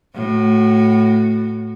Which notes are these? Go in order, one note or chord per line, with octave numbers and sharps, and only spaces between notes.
A2 F#4